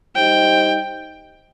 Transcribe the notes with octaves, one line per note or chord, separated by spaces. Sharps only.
G3 D#4 G4 C5 D#5 G5